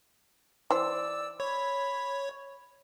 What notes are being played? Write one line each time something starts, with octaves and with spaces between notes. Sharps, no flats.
E3 C5 D5 E6
C#5 B5